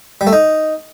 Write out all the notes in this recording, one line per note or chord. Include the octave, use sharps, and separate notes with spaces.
G3
A3
D#4